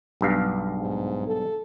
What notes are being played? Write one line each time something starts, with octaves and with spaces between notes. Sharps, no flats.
B1 G2 F5
G#2
A4